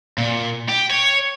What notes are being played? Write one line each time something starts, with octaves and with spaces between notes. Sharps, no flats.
A#2
G4
C#5